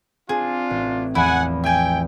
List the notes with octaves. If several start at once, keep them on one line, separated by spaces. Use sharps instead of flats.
C4 D4 F4 G#4
A1
E2 F3 E4 F#5 G#5
E5 G5 G#5